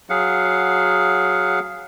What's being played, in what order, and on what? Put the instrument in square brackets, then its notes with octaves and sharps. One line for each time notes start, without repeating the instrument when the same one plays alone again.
[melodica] F#3 G#4 F5 F#5